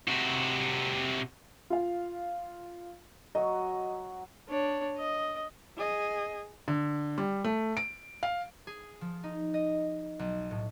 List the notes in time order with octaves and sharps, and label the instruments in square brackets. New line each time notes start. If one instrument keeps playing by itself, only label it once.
[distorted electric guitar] C3 F#4
[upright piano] F4 F5
[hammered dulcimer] F#3 F#4 [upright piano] D#5
[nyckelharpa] D4 C#5
D#5
[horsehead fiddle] G#4 D#5
[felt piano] D3
G3
A3
D7
F5
[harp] G#4
F3
D#4
D#5
B1
A2